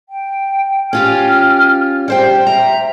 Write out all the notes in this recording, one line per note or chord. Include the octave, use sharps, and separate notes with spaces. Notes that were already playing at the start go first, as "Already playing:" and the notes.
G5
C#4 F4 G4 F6
G3 G4 C5 G5
E5 A#5